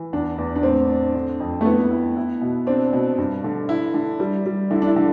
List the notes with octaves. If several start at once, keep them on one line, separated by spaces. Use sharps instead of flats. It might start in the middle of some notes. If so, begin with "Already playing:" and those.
Already playing: E3
E2 D4
E2
D4
A2 C4
D4
D3
F2
A3
B3 E4
E4
E4
B2
C4 D4
B2
G2
D3
E4
D3
G3
G3
D3 E4
D4
E4
D3